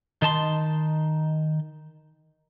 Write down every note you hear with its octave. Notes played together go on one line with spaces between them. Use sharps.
D#3 D#4 A5 C6